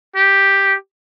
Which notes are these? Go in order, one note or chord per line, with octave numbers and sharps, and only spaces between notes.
G4